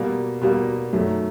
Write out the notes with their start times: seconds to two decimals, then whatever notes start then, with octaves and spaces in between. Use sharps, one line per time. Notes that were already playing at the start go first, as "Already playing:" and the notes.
Already playing: B2 G3 A#3
0.42 B2 G3 A#3
0.93 F#2 D#3 F#3 A3